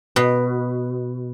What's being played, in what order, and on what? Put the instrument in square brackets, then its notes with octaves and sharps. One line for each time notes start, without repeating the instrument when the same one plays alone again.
[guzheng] B2